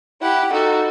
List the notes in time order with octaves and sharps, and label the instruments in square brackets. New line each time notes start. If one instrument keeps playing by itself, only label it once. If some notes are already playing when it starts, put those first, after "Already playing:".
[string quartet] E4 G4 [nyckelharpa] F#5
[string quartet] D#4 F#4 [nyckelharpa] A4